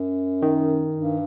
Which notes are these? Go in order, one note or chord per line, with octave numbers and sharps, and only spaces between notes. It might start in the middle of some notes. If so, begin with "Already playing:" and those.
Already playing: F#2
D#3
G2